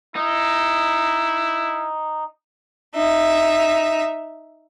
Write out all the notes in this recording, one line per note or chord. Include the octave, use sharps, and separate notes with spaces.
D#4 E4
D#4 E5